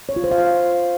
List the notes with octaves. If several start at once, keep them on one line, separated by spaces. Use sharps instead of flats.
C#5
F4
C5
F5